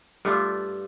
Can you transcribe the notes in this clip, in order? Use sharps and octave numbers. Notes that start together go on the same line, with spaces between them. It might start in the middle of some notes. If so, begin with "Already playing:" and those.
G2 A3 D4 F4